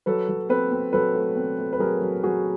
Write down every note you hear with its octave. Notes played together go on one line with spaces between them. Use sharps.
F#3 A4 B4
F#3
C4 A4 B4
C4
F#3 A4 B4
A3
C4
A3
B4
F#3 G#4 A#4
F#3
F#3 F#4 G#4